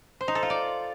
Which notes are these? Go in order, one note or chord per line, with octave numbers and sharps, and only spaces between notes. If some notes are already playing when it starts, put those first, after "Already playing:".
C5
D#4
A4
F4
D5